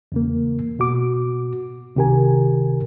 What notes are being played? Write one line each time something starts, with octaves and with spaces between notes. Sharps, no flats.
E2 C#3 A#3
B2 F#4 D6
C#2 C3 D#3 G4 A#4 G#5